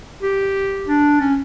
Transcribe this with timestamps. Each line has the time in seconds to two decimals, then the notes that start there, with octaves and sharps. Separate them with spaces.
0.22 G4
0.87 D4
1.20 C#4